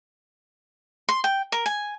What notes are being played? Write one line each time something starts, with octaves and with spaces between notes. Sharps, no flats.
C6
G5
A#4
G#5